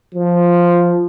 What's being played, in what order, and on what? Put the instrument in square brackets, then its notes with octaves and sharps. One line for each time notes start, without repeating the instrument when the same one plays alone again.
[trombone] F3